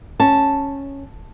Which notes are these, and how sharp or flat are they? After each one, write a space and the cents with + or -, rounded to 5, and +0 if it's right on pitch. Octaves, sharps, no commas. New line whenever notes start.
C#4 -5 A5 +0